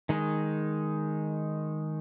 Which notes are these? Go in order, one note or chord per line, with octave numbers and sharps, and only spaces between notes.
D#3 G#3 D#4